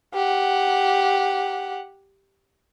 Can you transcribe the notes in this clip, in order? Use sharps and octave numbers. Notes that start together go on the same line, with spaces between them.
G4 F#5